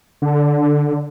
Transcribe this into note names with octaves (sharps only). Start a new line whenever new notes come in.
D3